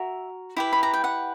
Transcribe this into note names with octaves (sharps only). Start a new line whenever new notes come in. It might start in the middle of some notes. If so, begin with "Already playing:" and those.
Already playing: F#4 A#4 E5
E4 G4 B4
B5
A#5
G5
F#5